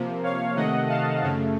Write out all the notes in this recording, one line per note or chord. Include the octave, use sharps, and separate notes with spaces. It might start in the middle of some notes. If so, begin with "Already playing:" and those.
Already playing: C3 F3 A#3
C#5 F5
C3 D#3 A3 D#5 F#5
F5 A5
F#2 C#3 A3